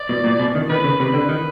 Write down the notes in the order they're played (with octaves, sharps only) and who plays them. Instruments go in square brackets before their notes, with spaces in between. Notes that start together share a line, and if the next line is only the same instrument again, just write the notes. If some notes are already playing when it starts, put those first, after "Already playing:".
Already playing: [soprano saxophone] D5
[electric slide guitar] B2
A#2
B2
D#3
[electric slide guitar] D#3 [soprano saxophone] B4
[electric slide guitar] C#3
[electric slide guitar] C3 [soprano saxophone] B4
[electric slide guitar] D3
D#3